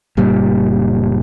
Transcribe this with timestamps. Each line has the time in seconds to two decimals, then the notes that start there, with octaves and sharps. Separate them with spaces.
0.17 F#1 A#2 G3